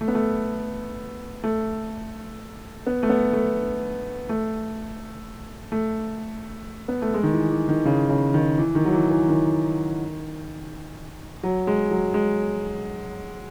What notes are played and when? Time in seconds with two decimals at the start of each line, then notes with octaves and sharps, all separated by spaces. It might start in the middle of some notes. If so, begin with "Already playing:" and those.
0.01 A3
0.08 B3
0.15 A3
1.44 A3
2.86 B3
3.03 A3
3.09 B3
3.33 A3
4.29 A3
5.72 A3
6.88 B3
7.02 A3
7.14 G#3
7.23 D#3
7.33 E3
7.50 E3
7.69 D#3
7.85 C#3
8.09 C#3
8.34 D#3
8.58 E3
8.75 D#3
8.85 F#3
8.93 E3
9.11 E3
9.28 D#3
11.43 F#3
11.67 G#3
11.91 F#3
12.14 G#3